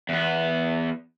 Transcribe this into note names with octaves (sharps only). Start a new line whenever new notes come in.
E2 B3